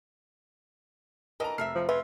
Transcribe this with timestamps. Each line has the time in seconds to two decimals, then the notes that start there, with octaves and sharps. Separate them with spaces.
1.40 D3 E3 A#4 D#5 A5 A#5
1.58 F1 A4 A#4 E5 F6 C7
1.75 F3
1.89 C#3 G#3 F4 B4 E5